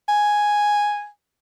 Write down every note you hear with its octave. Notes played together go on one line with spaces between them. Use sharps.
G#5